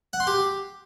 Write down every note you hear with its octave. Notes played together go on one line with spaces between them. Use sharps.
F#5
C6
G4